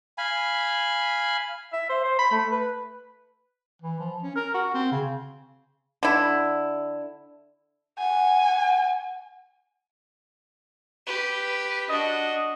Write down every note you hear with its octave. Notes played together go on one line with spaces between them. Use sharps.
F5 G#5 B5
E5
C5
C5
B5
A3
B4
E3
F3
C#4
A#4
F#4
C4
C#3
D3 E4
F#5 G#5
G4 B4
D4 F#4 D#5